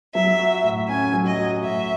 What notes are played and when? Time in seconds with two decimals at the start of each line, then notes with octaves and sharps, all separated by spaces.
0.14 F#3 E5
0.39 F#4
0.64 A2
0.89 C#4 G#5
1.13 F#3
1.25 D#5
1.38 F#4
1.62 A2 E5